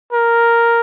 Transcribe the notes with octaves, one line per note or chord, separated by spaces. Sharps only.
A#4